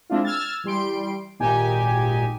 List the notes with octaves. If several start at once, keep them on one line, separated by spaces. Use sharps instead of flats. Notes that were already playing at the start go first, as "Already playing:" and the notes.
G#3 C4 D4 E4 F4
E6 F6 G#6 A6
E3 G3 C6 D7
G#1 A#2 D#4 G4 G#5